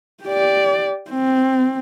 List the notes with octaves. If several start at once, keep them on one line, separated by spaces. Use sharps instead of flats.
G4 D5
C4